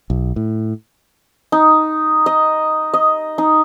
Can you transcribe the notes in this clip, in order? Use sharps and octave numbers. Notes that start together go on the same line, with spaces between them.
B1
A2
D#4
D#5
D#5
D#4